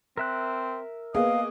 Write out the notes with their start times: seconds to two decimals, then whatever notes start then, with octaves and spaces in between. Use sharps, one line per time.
0.17 C4 A#4 E5 F#6
1.14 A#3 B3 G#4 D#5 F5